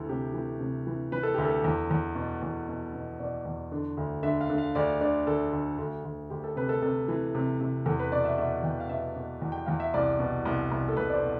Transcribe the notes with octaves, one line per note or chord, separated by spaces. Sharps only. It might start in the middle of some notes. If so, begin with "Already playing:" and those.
Already playing: D2 E3 A4
C3 G4
E3
C3
E3
E3 B4
A4
D2 G4
A4
E2
E2
B2
E2
B2
B2
B2 D5
E2
D3
D2
D3 E5
F5
D3
F5
D2 D5
D3 D5
D2 A4
D2
D2
D2
D2 G4
A4
C3 B4
A4
C3 A4
E3
C3
C3
E2 A4
B4
B2 D5
E5
B2 E5
E2 G5
F5
B2 E5
B2
E2
G5
E2 F5
E5
C2 D5
B2
C2
C2
A4
C2 B4
D5
C5
B2